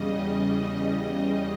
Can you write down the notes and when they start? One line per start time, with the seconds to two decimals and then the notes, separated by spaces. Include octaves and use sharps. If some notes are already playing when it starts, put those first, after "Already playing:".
Already playing: E2 C#3 G3 D#5